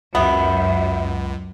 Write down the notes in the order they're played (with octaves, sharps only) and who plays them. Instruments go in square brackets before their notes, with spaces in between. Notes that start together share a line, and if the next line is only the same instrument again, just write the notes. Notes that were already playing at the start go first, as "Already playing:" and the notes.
[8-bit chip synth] C#2 [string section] F#2 [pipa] B3 [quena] E5